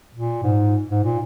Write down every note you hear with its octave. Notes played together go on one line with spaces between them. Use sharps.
A#2
G#2
G#2
A#2